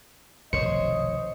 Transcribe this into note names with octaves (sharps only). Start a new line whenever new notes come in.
F1 B1 D#3 C5 C#5 D#5 C#7